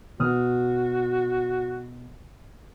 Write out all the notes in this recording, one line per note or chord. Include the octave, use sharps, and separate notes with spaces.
B2 F#4 D#6 F6